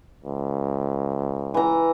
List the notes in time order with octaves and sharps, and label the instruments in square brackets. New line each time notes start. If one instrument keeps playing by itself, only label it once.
[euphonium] C#2
[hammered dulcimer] E3 A#5